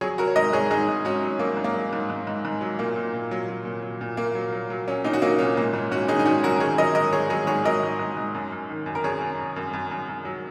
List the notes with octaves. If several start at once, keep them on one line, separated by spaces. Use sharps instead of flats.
F#3 G#4 C#5
F#3 F#4 A#4
C#5
G#2 A#4 D#5
G#2 G#4 C#5
G#2 D#4 G#4
G#2
G#2 C#4 F#4
F#3
F#3 A#3
G#2
A#3
F#3
G#2
G#2
G#2
G#2
F#3
A#2 A#3
A#2
A#2
F#3
F#3
A#2
F#3
A#2
A#2 A#3
F#3
F#3
F#3
F#3 C#4
A#2 A#3 D#4
F#4
F#3 A#3 D#4
A#2 C#4
G#2 A#3
G#2 C#4
G#2 C#4 F#4
D#3 D#4 G#4
D#4
G#2 C#4 F#4
F#3 F#4 A#4
A#4
D#3 G#4 C#5
F#3 A#4 D#5
G#2 A#4 D#5
G#2 G#4 C#5
F#3 G#4 C#5
G#2 G#4 C#5
F#3 A#4 D#5
G#2
G#2
G#2
F#2
F#2
D#3
F#2
A#4
F#2 G#4 C#5
F#2
F#2
F#2
F#2
F#2
F#2
F#3